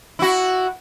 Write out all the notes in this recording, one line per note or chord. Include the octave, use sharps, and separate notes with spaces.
E4 F#4